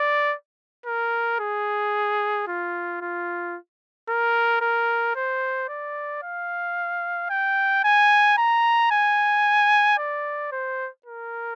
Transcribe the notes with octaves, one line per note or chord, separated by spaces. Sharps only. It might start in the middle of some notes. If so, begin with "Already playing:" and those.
Already playing: D5
A#4
G#4
F4
F4
A#4
A#4
C5
D5
F5
G5
G#5
A#5
G#5
D5
C5
A#4